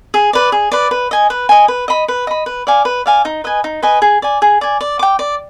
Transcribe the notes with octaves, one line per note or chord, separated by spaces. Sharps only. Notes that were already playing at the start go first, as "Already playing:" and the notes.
G#4
B4 D5
G#4
B4 D5
B4
D#5 G#5
B4
D#5 G#5
B4
D#5 B5
B4
D#5 B5
B4
D5 F5 G#5
B4
D5 F5 G#5
D#4
B4 D#5 G#5
D#4
B4 D#5 G#5
G#4
D5 G#5
G#4
D5 G#5
D5
G5 D6
D5